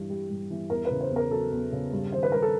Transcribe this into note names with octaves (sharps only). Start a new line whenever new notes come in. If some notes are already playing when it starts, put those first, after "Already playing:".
Already playing: G2 E3
G3
G2
E3
E2 A#4
B4
C#3
C5
E2
A#4
F#3 A4
E2
C#3
G2
D#3 C5
B4
G2 A#4
A4